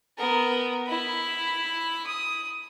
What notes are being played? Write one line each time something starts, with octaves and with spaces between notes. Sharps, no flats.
B3 A#4
E4 B5
D#6